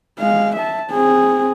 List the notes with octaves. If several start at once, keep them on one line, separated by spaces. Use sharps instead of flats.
G#3 F5
E5 A5
C4 G#4